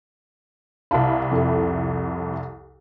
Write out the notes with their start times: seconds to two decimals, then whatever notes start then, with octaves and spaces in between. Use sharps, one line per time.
0.91 C2 E4 F5 A5 B5
1.31 F2 A4